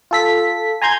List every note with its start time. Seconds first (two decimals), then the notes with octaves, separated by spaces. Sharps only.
0.11 F4 A4 B6
0.82 G#5 A#5 C6 G6 G#6